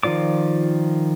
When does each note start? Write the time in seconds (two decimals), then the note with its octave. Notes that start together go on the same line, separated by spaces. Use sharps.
0.03 D#3 F3 F4 D5 D6